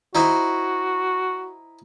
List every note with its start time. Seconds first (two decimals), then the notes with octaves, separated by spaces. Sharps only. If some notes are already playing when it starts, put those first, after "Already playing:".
0.15 D#4 E4 F#4 C5